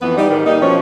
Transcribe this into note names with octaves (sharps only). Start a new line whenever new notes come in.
F2 E3 B3 B4
G3 D#4
G#2 D#3 G3
G3 A#3 D#4
B2 F3 C#4 C#5